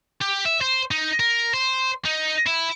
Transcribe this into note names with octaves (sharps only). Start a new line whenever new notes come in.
G4
E5
C5
D#4
A#4
C5
D#4
E4